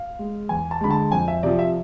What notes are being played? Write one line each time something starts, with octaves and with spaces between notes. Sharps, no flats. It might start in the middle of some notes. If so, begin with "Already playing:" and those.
Already playing: F5
G#3
E2 G#5
A5
D3 G#3 B5
A5
F2 G#5
E5
C3 F3 D5
E5